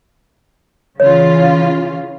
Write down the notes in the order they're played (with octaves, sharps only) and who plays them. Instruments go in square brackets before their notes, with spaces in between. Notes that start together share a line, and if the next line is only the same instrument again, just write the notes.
[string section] C#3 E3 F4 [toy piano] C#5